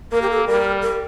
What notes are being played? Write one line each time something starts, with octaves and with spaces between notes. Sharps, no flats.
A#3 A#4
G4
A4
G3 A#4
A#4